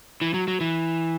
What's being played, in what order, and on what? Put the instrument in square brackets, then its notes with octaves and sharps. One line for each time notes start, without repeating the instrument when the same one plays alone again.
[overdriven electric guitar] E3
F#3
F#3
E3